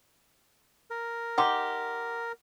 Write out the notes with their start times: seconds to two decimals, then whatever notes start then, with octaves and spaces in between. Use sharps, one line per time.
0.90 A#4
1.38 D#4 G4 F#5 C6 D6